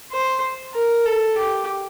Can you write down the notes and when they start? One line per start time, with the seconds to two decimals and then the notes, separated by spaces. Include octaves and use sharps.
0.12 C5
0.74 A#4
1.05 A4
1.38 G4